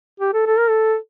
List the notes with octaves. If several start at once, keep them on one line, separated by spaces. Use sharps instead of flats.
G4
A4
A4
A#4
A4